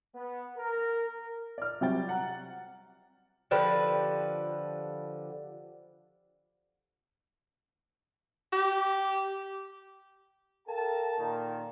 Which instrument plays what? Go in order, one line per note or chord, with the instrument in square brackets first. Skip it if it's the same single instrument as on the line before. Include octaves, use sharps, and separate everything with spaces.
[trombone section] B3
A#4
[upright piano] D5 F6
C3 F#3 G3 G5 A6
F#5 A#5
[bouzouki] D3 F3 G4 B4
[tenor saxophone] G4
[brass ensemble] A4 A#4 F5 G5 A5
A#2 D#3